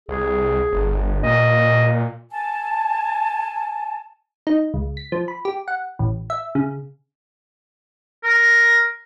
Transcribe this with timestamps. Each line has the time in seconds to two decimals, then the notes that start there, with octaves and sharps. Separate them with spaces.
0.09 C2 G#4
0.73 G1
1.23 A#2 D#5
2.31 G#5 A5
4.47 D#4
4.74 C#2
4.97 B6
5.12 F3
5.28 B5
5.45 G4
5.68 F#5
5.99 A1
6.30 E5
6.55 C#3
8.24 A#4